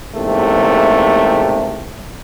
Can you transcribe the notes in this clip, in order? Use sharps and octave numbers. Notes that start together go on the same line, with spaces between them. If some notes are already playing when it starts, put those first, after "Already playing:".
A1 E2 G#2 C3 A3 A#3